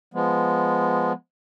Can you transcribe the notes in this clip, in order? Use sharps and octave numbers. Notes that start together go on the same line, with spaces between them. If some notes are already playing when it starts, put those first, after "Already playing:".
F3 G#3 B3